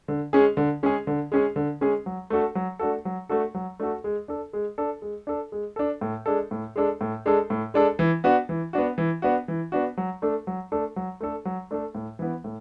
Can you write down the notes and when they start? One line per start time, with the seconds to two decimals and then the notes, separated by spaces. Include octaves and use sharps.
0.08 D3
0.33 G#3 C#4 G#4
0.57 D3
0.83 G#3 C#4 G#4
1.07 D3
1.32 G#3 C#4 G#4
1.56 D3
1.81 G#3 C#4 G#4
2.06 F#3
2.30 A3 D4 F#4 A4
2.55 F#3
2.79 A3 D4 F#4 A4
3.05 F#3
3.29 A3 D4 F#4 A4
3.55 F#3
3.80 A3 D4 F#4 A4
4.04 G#3
4.28 D4 A4
4.53 G#3
4.78 D4 A4
5.02 G#3
5.27 D4 A4
5.52 G#3
5.76 D4 A4
6.01 A2
6.26 G#3 D4 A4
6.51 A2
6.76 G#3 D4 A4
7.01 A2
7.26 G#3 D4 A4
7.50 A2
7.74 G#3 D4 A4
7.99 E3
8.24 B3 D4 F#4
8.49 E3
8.73 B3 D4 F#4
8.98 E3
9.22 B3 D4 F#4
9.48 E3
9.72 B3 D4 F#4
9.97 F#3
10.22 A3 D4 A4
10.47 F#3
10.72 A3 D4 A4
10.96 F#3
11.21 A3 D4 A4
11.45 F#3
11.71 A3 D4 A4
11.95 A2
12.19 E3 B3
12.44 A2